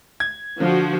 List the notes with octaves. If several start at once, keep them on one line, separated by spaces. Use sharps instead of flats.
G#6
D3 F3 F#4